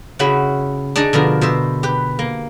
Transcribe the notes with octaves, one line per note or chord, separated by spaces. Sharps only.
C#3 C#4 E4 F#4 E5 B5
D4 D#4 G#4 D5 D#5
B2 D3 F3 A#4
B2 C5 E5
G4 B4
A#3